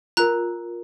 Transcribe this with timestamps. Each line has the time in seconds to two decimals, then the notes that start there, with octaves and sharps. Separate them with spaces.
0.17 F4 A#4 A#5 F#6